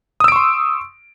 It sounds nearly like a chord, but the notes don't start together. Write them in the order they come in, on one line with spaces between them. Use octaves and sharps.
D#6 E6 D7 C#6 C6